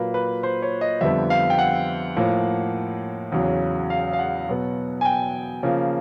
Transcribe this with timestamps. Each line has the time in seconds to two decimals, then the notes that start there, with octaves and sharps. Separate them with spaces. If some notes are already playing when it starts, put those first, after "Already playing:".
Already playing: A#2 F#3 A#3 B4
0.14 B4
0.43 C5
0.62 C#5
0.81 D#5
1.01 F2 D3 G3 B3 E5
1.30 F5
1.50 G5
1.59 F#5
2.16 A2 F3 A#3
3.32 E2 C#3 F#3
3.90 F5
4.13 F5
4.19 F#5
4.48 B2 F#3 B3
5.01 G#5
5.05 G5
5.63 C#3 F3 A#3